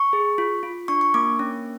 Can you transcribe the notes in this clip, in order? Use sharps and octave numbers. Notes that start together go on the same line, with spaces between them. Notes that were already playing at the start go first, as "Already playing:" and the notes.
Already playing: C#6
G#4
F4
F4
D4 C#6
C#6
A#3 D6
C#4